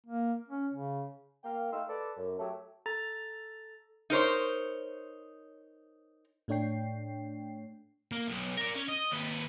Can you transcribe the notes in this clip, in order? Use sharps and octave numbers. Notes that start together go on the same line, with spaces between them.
A#3
C#4
C#3
A#3 F5 G5
A3 D#4 F5 G5 C6 E6
A4 B4 D5
F#2
F#3 A3 G4 A4
A4 A#5 A6
D#4 A#4 C5 C#5
A2 A3 D4 C#5 G5 C7
A#3
B1
A#4 D5
C#4
D#5
D#2 B4